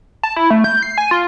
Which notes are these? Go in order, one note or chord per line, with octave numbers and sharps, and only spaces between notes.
A5
E4
A3
G6
C7
G#5
F4